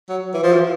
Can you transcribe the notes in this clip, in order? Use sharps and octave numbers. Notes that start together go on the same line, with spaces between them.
F#3
E3
F3
E3